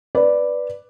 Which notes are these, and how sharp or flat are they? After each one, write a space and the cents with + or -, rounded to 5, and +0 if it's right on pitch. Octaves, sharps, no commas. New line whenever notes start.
B4 +0 D5 +0